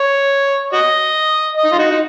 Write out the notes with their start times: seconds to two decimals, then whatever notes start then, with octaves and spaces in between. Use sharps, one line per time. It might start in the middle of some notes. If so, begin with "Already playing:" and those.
Already playing: C#5
0.73 F#4 D#5
1.57 D#5
1.64 D#4
1.72 F4
1.79 D#4 F#4
1.90 D#4